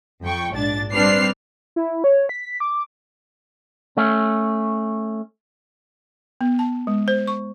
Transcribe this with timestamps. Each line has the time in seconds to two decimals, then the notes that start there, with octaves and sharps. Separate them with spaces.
0.23 F2 G5 C#6
0.52 A#1 G#2 D4 A6
0.91 G3 C4 D4 B4 F6 C7
1.76 E4
2.04 C#5
2.29 B6
2.60 D6
3.97 A3 C#4
6.41 B3
6.59 A5
6.87 G#3
7.08 C5
7.27 C#6